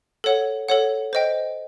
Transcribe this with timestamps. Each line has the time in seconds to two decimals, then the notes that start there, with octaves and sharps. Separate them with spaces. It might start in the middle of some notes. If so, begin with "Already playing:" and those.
0.24 A4 C#5 F#5
0.68 A4 C#5 F#5
1.13 C5 D#5 G5